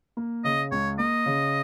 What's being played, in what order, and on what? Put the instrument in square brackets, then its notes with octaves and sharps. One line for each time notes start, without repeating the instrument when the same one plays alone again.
[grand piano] A#3
[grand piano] C#3 [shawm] D#5
[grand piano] C#2 [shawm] C#5
[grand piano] A#3 [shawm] D#5
[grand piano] C#3